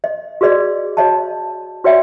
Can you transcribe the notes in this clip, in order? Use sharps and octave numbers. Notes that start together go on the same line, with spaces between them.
D#5
F#4 G#4 B4 D5 D#5
F#4 C#5 D#5 A5
F#4 B4 C#5 D5 E5 G5